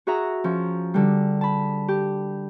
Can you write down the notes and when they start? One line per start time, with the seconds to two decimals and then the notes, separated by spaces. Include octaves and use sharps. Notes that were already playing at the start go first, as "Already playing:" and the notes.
0.07 F#4 G#4 E5 F#5 A#5
0.44 F3 C#4
0.94 D3 G3
1.41 A5 B5
1.88 G4